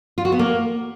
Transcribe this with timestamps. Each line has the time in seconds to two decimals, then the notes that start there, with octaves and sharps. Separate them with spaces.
0.18 F4
0.25 F#4
0.32 B3
0.39 A#3